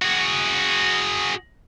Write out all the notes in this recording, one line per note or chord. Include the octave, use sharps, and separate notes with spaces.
F#4 G#4